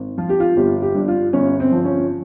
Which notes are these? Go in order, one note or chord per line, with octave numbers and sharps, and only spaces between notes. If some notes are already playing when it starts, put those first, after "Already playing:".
Already playing: G#1
F3 F4
G4
F4
G1 G4
G4
G2
F4
G1 C#4
C4
F3
C#4